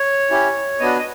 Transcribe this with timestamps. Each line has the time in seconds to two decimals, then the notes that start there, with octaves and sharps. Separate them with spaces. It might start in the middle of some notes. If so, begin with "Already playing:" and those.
Already playing: C#5
0.31 C#4 E4 G4
0.80 B3 D4 F#4 D#5
0.99 D#5